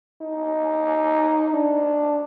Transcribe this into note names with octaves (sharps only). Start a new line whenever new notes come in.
D#4
D4